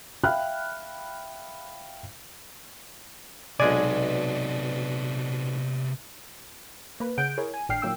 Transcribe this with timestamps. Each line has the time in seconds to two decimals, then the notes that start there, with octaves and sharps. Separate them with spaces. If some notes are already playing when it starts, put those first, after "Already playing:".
0.24 E5 F5 G5 B5 F6 F#6
3.60 B1 C3 G#3 B3 D5 G#5
7.00 A#3 B4
7.18 C#3 G#4 F#5 G6 D7
7.38 E4 G#4 A#4 C#5
7.54 G#5
7.69 G#1 A2 D4 G5 F6 C7
7.82 A#2 D#3 F#3 A#3 G5 E6